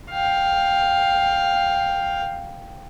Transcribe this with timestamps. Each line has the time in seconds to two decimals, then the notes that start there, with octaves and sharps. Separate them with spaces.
0.11 F5 G5